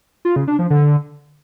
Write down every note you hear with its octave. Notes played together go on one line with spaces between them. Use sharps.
F4
C#3
D4
F3
D3